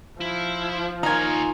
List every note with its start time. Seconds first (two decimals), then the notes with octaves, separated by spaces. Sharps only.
0.21 F3 E4
1.03 D#2 D#4 F4 A#4 C#5 G#5